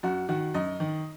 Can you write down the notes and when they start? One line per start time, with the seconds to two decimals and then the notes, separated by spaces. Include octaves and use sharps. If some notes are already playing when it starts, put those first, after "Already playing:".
0.03 F#2 F#4
0.29 D#3 F#4
0.54 F#2 D#5
0.80 D#3